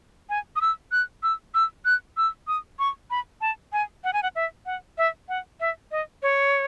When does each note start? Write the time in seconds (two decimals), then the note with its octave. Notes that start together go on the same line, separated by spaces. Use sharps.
0.29 G#5
0.56 D#6
0.61 E6
0.92 F#6
1.23 E6
1.54 E6
1.85 F#6
2.17 E6
2.48 D#6
2.79 C#6
3.10 B5
3.41 A5
3.73 G#5
4.04 F#5
4.13 G#5
4.23 F#5
4.35 E5
4.66 F#5
4.98 E5
5.29 F#5
5.60 E5
5.91 D#5
6.23 C#5